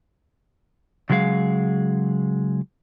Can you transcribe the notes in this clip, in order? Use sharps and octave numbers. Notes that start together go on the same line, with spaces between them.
C#3 F#3 G#3 G#4 F5